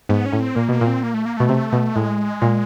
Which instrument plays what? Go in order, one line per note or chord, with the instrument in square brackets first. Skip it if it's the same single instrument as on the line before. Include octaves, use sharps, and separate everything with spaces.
[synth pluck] G#2 [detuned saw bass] B3
[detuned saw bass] C#4
[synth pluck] A2
[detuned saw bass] C4
[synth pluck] A#2 [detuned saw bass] A#3
[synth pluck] B2 [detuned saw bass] A#3
[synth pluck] A#2
[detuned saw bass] C4
A#3
A3
A#3
[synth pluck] B2 [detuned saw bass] A3
[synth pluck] C3
B2
[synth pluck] A2 [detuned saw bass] G#3
[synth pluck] A#2